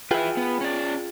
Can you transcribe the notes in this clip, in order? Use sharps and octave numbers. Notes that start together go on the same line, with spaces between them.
F4 G#4 B4 E5 G5
B3
C#4 D5